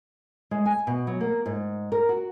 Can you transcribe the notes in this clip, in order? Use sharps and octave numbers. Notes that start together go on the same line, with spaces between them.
G#3
G#5
B2
F#3
A#3
G#2
A#4
F#4